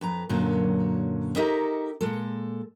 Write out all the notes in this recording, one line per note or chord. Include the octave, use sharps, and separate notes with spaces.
F2 B4 A#5
F#2 A#2 D3 F#3 C#4
D#4 G4 A4 A#4 D#5 E5
A#2 G#3 A4